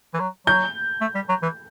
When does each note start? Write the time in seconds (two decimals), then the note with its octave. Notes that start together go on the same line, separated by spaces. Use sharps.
0.14 E3
0.20 F#3
0.47 F#3 G6
1.01 A3
1.15 G3
1.29 F#3
1.43 E3